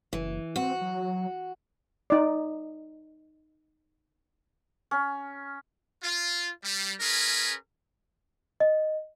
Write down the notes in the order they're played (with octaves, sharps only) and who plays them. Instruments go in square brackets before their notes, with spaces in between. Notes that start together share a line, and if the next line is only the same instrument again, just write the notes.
[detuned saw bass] F#1 [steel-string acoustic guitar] E3
[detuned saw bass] C4 [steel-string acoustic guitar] F#4
[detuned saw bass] F#3
[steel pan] D#4 D5
[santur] C#4
[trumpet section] F4
G3
C#4 G#4 A#4 B4
[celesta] D#5